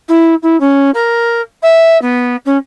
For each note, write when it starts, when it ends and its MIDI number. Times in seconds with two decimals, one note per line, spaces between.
0.09 0.35 64
0.43 0.59 64
0.60 0.91 61
0.94 1.42 70
1.63 2.00 76
2.02 2.36 59
2.46 2.57 61